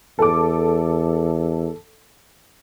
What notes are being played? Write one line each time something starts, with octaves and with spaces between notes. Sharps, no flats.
E2 A4 D6